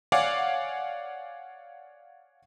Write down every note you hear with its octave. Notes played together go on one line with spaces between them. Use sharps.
C#5 D5 F5 F#5 G#5 D6